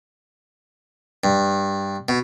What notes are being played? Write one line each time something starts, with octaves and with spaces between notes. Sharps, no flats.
G2
B2